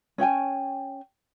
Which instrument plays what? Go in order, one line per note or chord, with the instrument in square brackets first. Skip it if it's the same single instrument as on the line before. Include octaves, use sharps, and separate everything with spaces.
[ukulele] C#4 C#5 G5 G#5